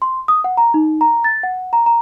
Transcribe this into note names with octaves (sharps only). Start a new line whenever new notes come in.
C6
D#6
F#5
A#5
D#4
A#5
A6
F#5
A#5
A#5